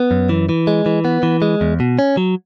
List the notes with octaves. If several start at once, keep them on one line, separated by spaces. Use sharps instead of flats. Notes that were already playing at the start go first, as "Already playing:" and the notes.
Already playing: B3
F#2
E3
E3
G#3
E3
B3
E3
G#3
E2
B2
C#4
F#3